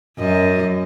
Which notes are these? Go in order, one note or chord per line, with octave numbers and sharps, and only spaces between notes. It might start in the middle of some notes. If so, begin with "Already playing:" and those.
F#2 D#5